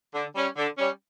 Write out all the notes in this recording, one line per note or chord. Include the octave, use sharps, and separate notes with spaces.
D3
G3 C#4
D3
G3 C#4